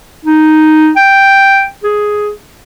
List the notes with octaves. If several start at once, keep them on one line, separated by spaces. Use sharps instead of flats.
D#4
G5
G#4